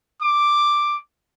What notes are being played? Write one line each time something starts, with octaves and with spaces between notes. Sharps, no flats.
D6